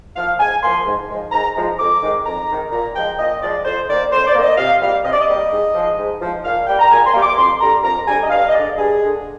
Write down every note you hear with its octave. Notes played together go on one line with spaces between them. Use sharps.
F3 A#3 F5
G#2 G#5
F3 A#3 C6
G#2
F3 G#3
G#2 A#5
F3 G#3
F2 D6
D#3 G#3
F2 A#5
D#3 G#3
A#2 A#5
F3 G#3 G5
A#2 D#5
F3 G#3 D5
F2 C5
D#3 A#3 D5
F2 C5
D5
D#3 A#3
D#5
C3 F5
G3 A#3 F5
C3 D#5
D5
D#5
G3 A#3
G#2
F3 G#3
G#2
F3 G#3
A#2 F5
G3 A#3 G5
A#5
A#2 G#5
C6
G3 A#3
D6
F2 C6
D3 G3 A#5
F2 A#5
D3 G3 G#5
D#5
G2 F5
D#5
D3 G#3 D5
G2 G#4
D3 G#3